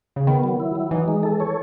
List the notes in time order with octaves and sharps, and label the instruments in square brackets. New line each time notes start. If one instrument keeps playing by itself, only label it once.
[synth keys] C#3
[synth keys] D#3 [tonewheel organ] B3
[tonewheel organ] F#3
E4
F#3
[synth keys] E3 [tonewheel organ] D#4
[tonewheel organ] G#3
A4
C#5